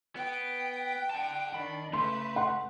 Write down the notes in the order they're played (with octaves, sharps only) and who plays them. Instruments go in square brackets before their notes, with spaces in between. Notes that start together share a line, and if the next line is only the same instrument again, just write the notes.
[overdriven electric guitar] B3 [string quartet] G5
[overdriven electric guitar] F#5 A5
[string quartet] D#3 D4 [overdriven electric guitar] B5
[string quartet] C#3 B4 [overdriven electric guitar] A3 [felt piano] C6
[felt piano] F#5 C6